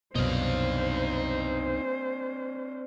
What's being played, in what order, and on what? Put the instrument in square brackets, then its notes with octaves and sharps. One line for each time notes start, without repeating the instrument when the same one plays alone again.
[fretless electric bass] C2 F#2 B2 [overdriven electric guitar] C4 D4 [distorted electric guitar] D#4 F5 [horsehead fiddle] C5